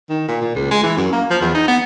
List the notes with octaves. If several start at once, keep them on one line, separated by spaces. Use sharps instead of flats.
D#3
A#2
A#2
C#2
G#3
E3
F#2
A#3
F3
E2
D#4
B3